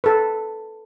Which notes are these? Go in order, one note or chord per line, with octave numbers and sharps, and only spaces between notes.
A4 B4